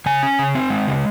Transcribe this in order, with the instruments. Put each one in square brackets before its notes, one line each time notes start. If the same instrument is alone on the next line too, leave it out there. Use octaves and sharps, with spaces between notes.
[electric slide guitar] C#3 G#5
C#4
C#3
C4
G#3
C#3